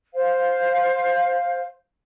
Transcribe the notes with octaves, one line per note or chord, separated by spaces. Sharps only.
C5 F5